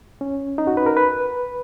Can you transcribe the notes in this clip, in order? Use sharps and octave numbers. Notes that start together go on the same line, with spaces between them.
C#4
D#4
F#4
B4
A#4
B4